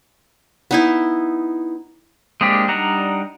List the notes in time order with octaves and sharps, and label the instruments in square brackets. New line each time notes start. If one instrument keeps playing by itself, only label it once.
[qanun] B3 D#4 E4
[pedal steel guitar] G#3 A#3 C4 D4 G4
G3 D4 D#4 F#5 A#5